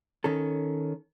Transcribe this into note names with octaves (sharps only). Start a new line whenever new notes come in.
D#3 C#4 A4